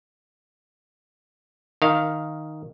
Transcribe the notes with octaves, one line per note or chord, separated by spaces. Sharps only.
D#3 F5